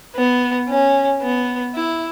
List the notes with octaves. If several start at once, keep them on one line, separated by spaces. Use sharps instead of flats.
B3
C#4
B3
E4